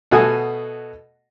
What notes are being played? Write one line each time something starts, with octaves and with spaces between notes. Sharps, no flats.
B2 A3 F#4 A4 G#5 D#6